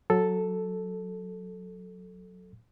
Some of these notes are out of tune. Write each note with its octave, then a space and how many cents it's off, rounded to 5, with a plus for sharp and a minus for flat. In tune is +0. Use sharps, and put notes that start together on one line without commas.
F#3 -10 A4 +0